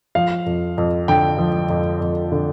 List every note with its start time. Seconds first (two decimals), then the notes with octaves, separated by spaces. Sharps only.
0.15 F3 F5
0.46 F2
0.78 F2
1.08 D3 G5
1.38 F3
1.70 F2
2.00 F2
2.32 D3